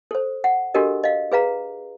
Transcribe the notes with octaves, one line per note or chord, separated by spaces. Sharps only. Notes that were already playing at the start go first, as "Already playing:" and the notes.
A4 C5
F#5
D4 F#4 G4 A4 A#4 D#5
D#5 F5
G#4 B4 F5 A#5